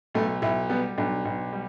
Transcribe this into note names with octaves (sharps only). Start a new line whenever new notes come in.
B1 A3
B1 E4
G3 B3
B1 D4
B1
G3